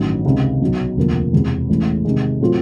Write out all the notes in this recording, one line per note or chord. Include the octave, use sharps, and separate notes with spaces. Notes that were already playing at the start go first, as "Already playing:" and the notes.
Already playing: A1 G2 D#3 F#3
C#2 C3 D#3
B1 B2 F#3
E1 D2 C3 F3 A#3
E1 E2 C3
A1 A2 E3 G#3
C3 D#3 G#3
A2 F#3 A3 C4 F4